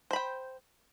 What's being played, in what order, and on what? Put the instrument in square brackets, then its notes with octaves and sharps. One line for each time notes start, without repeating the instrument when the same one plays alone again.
[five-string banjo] C5
B5
G5